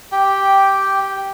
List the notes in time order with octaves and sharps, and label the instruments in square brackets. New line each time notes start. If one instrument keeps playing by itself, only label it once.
[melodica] G4 G5